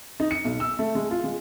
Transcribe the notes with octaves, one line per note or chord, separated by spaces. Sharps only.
D#4
C#7
B1
E6
A3
G#3
F4
G#3